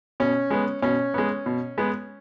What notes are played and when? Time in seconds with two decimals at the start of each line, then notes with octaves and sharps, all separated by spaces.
0.20 B2 C#4
0.50 G#3 B3
0.82 B2 C#4
1.14 G#3 B3
1.46 B2
1.78 G#3 B3